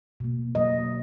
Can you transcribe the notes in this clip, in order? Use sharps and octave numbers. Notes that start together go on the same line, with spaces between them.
B2 A#3
B2 F#3 A#3 D#5